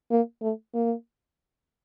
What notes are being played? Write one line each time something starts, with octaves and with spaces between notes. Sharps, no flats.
A#3
A3
A#3